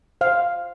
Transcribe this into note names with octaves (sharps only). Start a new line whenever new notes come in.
C5 F5